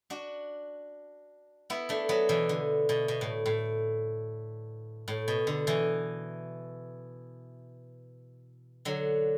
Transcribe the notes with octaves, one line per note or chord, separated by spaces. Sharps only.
D4 F#4
B3 E4
A3 D4
F#3 B3
B2 E3
D3
B2
B2
A2
A2
A2
B2
D3
B2 E3
D3 F#3